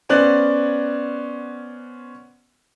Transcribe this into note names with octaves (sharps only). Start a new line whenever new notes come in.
B3 C#4 C5 D5 F#6